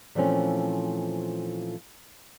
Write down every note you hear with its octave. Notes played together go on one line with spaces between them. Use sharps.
A#2 E3 F3 A3 C4 C#4